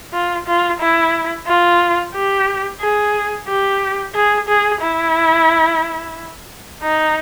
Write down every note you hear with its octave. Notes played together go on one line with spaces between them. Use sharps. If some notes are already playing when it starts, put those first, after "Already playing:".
F4
F4
E4
F4
G4
G#4
G4
G#4
G#4
E4
D#4